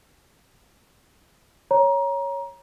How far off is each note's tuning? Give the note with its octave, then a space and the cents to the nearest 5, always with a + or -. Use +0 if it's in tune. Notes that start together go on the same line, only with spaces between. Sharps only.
C#5 +0 A#5 +20